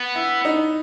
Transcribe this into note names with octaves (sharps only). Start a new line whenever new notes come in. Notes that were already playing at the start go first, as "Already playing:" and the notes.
Already playing: B3
E4
D#4